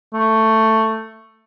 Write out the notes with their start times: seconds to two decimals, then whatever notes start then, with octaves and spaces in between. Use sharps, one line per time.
0.13 A3